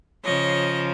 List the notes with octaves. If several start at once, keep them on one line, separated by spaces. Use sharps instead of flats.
C#3 F3 C#5 D#5